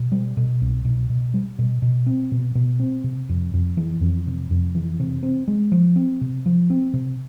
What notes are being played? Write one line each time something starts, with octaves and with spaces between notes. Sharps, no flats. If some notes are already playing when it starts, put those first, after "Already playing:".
Already playing: B2
G3
B2
C2
B2
B2
G3
B2
B2
C4
B2
B2
C4
C3
F2
F2
E3
F2
C3
F2
E3
C3
C4
G#3
F3
C4
C3
F3
C4
C3